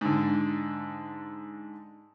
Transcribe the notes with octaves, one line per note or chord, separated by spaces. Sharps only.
G#2 D3